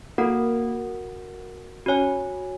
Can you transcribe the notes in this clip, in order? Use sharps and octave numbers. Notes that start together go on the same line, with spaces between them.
A#3 F#4 A#4 F#5
C#4 F#4 C#5 G#5